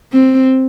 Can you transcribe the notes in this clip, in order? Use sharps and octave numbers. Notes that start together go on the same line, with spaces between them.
C4